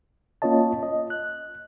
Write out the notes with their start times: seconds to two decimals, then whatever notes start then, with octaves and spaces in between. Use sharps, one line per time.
0.42 A#3 C#4 F4 C#5 D#5 A5
0.83 D#5
1.10 F#6